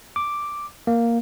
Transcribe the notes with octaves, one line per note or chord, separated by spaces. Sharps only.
D6
A#3